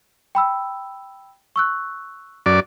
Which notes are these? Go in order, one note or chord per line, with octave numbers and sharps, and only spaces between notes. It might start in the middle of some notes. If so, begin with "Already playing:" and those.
G5 B5 E6
C#6 E6 F#6
F#2 D5